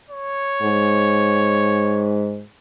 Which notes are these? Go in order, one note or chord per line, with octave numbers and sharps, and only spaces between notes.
C#5
G#2